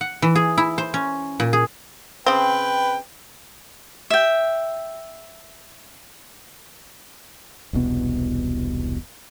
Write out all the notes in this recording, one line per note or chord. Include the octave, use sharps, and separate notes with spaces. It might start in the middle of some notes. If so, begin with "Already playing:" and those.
F#5
E3
G#4
E4
C5
C#4
A#2
G#4
C#3 C4 B4 G5
E5 G5
E1 C2 B2 B3